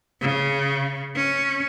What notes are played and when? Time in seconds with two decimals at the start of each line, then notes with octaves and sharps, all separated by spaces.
0.21 C#3
1.16 C#4